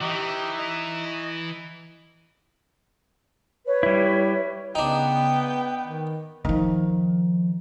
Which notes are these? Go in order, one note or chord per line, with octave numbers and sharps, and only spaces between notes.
E3 D#4 G4 D#5 E5 C#6
D#5
B4 C#5
G3 E4
C#3 B3 D4 D#4 G5
D#3
D#3 F3